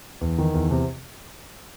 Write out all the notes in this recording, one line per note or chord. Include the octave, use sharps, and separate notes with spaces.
E2
D#3
E2
C3